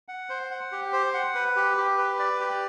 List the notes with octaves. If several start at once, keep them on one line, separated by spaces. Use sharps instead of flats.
F#5
C5
F#5
G4
C5
F#5
B4
G4
G4
B4
D5
G4